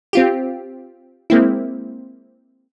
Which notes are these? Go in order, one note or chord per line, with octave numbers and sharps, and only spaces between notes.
C4 F4 G4
G#3 A#3 C4 E4